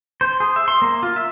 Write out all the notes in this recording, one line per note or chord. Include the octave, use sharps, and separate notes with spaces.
C5
G#4
E5
C6
A#3
F4
E5